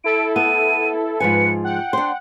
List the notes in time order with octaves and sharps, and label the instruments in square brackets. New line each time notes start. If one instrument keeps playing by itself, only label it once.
[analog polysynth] E4 A4 [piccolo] D7
[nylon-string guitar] B3 [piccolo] D#7
[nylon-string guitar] G#2 F3 G#5 [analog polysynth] B4 [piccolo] C#7
[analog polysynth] F#5 [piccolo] G5
[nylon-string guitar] D4 C5